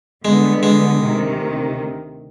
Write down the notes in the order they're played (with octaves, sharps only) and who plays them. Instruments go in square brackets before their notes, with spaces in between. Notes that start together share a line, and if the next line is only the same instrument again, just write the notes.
[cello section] D3 G3 B3 [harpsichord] G#3
[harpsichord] G#3
[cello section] D2 C3 D#3